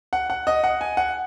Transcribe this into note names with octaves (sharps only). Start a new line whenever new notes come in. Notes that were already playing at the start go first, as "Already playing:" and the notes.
F#5
F#5
D#5
F#5
G#5
F#5